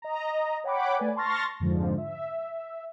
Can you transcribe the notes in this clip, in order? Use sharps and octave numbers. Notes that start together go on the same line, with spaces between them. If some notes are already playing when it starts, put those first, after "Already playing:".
D#5 A#5
C#5 F#5 G5 B5 D6
A3 B4 D5 G#5
A5 C6 C#6 F6 A6 A#6
F2 G#2 D3 F3
E5